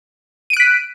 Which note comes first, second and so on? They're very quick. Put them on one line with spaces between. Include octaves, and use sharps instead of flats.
D#7 D7 F#6 B6